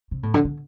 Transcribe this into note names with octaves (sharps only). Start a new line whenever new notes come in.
C3
A2
D3
D3